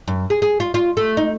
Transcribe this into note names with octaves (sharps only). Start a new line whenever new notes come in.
F#2
G#4
G#4
F4
F4
A3
D#4